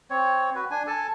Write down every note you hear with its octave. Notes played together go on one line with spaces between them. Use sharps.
C4 C#5
F#4 B4
D4 G#5
A4 G#5 A5